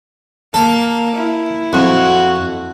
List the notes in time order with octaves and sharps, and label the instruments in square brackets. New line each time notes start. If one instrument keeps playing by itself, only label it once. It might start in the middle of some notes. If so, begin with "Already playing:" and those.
[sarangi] A#3 [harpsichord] A4
[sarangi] E4
[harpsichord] F2 [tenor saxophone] F#4